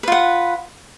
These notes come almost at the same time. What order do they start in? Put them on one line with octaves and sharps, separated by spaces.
B4 F4 F#5